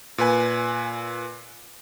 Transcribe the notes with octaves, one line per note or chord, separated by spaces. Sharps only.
A#2 B4 G#5